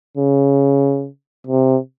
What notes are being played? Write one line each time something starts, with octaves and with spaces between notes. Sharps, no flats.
C#3
C3